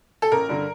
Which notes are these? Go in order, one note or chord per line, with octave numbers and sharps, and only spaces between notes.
A4
A1 A#4
G2 D3